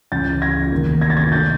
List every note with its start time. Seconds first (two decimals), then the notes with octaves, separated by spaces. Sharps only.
0.12 C#2 C#3 E3 G6 A6
0.42 G#6 A#6
0.72 F1 D#2 D#3
1.01 G#6 A#6
1.10 A6
1.17 G#6 A#6
1.32 D3 G6 A6